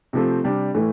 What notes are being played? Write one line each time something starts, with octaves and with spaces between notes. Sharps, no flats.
C3 F3 A3 C4
C3 G3 D4
A2 E3 A3